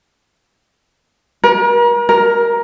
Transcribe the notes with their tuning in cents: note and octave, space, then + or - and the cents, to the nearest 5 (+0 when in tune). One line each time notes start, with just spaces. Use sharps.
A#4 +40
A#4 +15